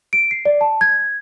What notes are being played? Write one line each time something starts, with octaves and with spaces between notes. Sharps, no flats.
D7
C7
D5
A5
G#6